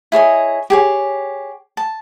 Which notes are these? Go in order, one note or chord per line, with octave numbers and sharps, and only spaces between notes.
E4 G#4 C#5 D#5
G4 G#4 C#5
A5